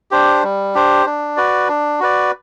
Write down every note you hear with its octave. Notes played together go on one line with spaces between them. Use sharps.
D4 G4 C5
G3
D4 G4 C5
D4
F#4 B4 D5
D4
F#4 B4 D5